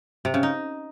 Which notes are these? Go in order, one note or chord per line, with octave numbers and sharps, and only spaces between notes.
C3
C#3
D#4